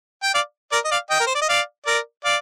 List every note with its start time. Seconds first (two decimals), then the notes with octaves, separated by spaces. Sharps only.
0.23 G5
0.34 D5 F5
0.72 A#4 D5
0.85 D#5
0.91 D5 F5
1.10 D#5 G5
1.20 A#4
1.27 C5
1.35 D5
1.41 D#5
1.49 D5 F5
1.86 A#4 D5
2.25 D5 F5